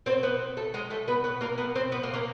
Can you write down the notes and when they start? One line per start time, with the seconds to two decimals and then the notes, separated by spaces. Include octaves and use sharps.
0.06 C4 C5
0.23 B3 B4
0.57 A3 A4
0.74 G#3 G#4
0.90 A3 A4
1.08 B3 B4
1.24 B3 B4
1.41 A#3 A#4
1.58 B3 B4
1.75 C4 C5
1.92 B3 B4
2.03 A#3 A#4
2.13 A#3 A#4